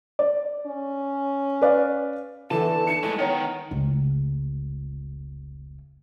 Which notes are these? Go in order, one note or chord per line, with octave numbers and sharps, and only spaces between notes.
D5
C#4
B4 D5 F5
E2 D3 E3 A4 A5
D#4 C#7
F2 E3 G#3 A3 E4
D#3 B3 C#5 A#5
F1 C#2